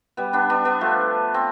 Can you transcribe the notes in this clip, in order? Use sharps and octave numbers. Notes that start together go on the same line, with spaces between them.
G3 B3
B3 D4
B3 D4
B3 D4
F3 A3
C4